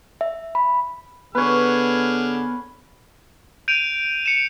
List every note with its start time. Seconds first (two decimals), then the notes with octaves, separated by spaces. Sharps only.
0.21 E5
0.55 B5
1.35 D3 B3 G#4 B4 C#5 F6
3.68 G6 D7 D#7 F7
4.26 C#7 E7